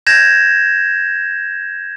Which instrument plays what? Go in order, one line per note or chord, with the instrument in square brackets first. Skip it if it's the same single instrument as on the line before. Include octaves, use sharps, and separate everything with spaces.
[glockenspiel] G6 G#6 A#6 E7